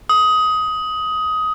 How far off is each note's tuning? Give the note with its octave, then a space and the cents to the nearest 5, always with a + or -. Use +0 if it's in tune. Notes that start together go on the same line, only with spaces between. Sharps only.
D#6 +15